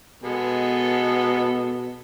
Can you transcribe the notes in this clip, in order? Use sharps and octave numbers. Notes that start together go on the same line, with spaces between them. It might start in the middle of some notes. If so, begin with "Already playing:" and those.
B2 G#3 B3 A4